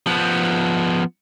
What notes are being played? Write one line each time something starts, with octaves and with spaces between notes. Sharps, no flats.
F3 B3